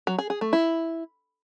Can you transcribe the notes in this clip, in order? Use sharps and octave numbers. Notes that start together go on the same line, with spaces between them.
F#3
G#4
G#4
A3
E4